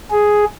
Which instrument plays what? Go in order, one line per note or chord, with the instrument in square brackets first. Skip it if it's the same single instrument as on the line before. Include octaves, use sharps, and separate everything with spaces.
[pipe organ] G#4